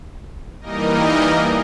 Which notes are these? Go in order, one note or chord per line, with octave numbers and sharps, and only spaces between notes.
E3 G3 A#3 D#4 A#4 D#5